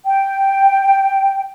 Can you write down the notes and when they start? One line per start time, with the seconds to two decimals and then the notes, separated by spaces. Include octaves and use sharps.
0.05 G5